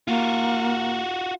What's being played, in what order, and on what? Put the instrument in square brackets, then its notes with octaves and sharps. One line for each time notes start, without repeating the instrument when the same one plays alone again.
[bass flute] A#3 [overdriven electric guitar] F4 F#4